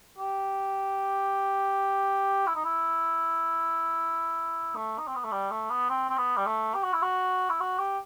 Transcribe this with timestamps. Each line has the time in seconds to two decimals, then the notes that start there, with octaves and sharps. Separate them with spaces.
0.18 G4
2.47 E4
2.56 D#4
2.65 E4
4.75 A3
4.98 D#4
5.07 C4
5.15 B3
5.24 A3
5.32 G3
5.51 A3
5.70 B3
5.90 C4
6.09 C4
6.17 B3
6.37 G3
6.46 A3
6.74 G4
6.83 F#4
6.93 E4
7.02 F#4
7.50 E4
7.61 F#4
7.79 G4